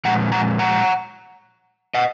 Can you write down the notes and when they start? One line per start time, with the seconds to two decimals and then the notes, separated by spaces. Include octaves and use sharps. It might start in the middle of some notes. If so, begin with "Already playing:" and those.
0.05 A#2 F3 G#3 F#5 A#5
0.32 F#5 A#5
0.59 F#5 A#5
1.94 D#5 F#5